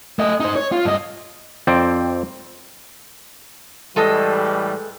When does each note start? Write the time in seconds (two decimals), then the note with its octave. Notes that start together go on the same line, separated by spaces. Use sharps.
0.19 A3 D#5
0.40 D#4 C5
0.56 C#5
0.72 F4
0.85 G2 D#5
1.67 F2 C4 D5 G5
3.96 A2 E3 G3 G#3 A4 D#5